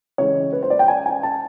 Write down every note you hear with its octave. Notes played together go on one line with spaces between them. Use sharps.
C#3 E3 G#3 C#5
B4
C5
D5
G5
G#5
G#5
A5